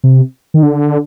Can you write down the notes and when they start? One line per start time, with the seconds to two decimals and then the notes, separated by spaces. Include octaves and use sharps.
0.04 C3
0.54 D#3
0.63 D3